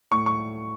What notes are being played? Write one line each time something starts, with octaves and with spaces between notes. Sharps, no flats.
A2 C#6
C#6